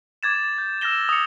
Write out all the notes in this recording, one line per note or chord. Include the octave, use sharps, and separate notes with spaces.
D6 G#6 A6 E7
G6
E6 F6 A6 A#6 E7 G7
D#6 C#7